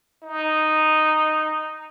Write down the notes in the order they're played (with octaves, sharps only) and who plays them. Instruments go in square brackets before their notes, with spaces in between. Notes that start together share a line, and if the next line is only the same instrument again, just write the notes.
[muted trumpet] D#4